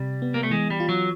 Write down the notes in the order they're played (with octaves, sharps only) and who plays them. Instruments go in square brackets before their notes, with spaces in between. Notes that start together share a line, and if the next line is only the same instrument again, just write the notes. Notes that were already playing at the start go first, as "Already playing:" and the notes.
Already playing: [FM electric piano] C3 [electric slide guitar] G3
[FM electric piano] B3
[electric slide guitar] A#3
A3
[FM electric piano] E3 [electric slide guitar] G#3
[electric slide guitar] G3
[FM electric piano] F4
[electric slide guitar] F#3